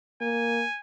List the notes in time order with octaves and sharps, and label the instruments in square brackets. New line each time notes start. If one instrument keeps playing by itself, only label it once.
[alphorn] A#3 [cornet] G#5